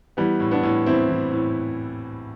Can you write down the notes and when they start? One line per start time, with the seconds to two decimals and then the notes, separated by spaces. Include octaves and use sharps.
0.17 E3 G3 B3
0.40 A2
0.51 B3 D4
0.63 A2
0.86 E3 C4 E4
1.09 E3
1.32 A2